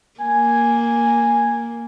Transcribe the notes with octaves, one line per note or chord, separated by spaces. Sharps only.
A#3 G#5